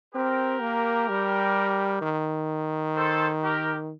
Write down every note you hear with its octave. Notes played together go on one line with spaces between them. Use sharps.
C4 G4 A#4
A#3
G3
D#3
A4 C5
G4 A#4